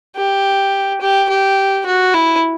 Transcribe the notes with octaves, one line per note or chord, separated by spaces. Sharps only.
G4
G4
G4
F#4
E4